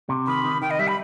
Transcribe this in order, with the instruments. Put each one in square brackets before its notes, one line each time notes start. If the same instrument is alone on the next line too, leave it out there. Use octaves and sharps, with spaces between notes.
[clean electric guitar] C3
[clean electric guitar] D#3 [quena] B5
[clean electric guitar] D#3
[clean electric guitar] D#3 [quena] G5
[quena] D#5
[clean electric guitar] G3 [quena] E5
[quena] B5